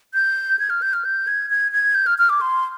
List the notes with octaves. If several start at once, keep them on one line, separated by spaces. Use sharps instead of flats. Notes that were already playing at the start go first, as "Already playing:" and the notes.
G6
G#6
F6
G6
F6
G6
G#6
G#6
G#6
G6
F6
F6
D6
C6